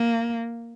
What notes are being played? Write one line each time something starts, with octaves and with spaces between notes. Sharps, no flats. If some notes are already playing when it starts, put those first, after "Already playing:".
Already playing: A#3